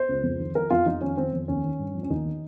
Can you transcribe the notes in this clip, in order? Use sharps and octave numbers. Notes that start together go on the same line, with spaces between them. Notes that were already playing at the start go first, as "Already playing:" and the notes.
Already playing: C5
C#2
F2
D#3
F3 A#4
F2 F4
F2 D#4
D#3 C#4
D#3 C4
F2
D#2 C#4
D#3
G2
F3
C#4
D#2 D#4
D#3